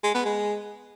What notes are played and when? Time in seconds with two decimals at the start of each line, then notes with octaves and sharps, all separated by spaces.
0.04 G#3
0.14 B3
0.25 G#3